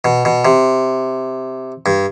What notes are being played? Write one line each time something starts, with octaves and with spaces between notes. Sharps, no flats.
B2
B2
C3
G2